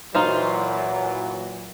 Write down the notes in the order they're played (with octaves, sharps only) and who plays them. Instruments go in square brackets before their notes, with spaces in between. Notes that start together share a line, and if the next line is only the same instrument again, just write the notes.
[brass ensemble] A#2 E3 F#3 [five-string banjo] D#4 F4 C5